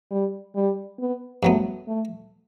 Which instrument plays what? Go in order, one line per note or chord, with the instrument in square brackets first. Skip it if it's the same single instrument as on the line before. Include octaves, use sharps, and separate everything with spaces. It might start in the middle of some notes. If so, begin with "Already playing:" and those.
[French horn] G3
G3
B3
[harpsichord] G2 F#3 B3 [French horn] A3
[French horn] A3